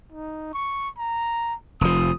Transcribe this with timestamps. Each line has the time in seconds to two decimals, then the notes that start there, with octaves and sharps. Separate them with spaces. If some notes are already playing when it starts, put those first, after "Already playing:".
0.12 D#4
0.54 C#6
0.98 A#5
1.81 F1 F3 D#6